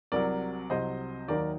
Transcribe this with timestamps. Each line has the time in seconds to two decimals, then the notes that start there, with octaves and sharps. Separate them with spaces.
0.12 C2 C3 F#3 A#4 D5
0.70 C2 C3 F#3 C5 D#5
1.28 D#2 D#3 F#3 A#4 D5